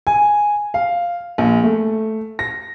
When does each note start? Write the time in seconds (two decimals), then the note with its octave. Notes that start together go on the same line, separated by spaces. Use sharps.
0.07 G#5
0.74 F5
1.38 A#1
1.64 A3
2.39 A#6